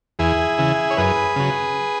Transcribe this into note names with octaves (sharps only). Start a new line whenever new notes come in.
E2 E4 G#4
C#3 E3
C#5
F#2 G#4 B4
C#3 F#3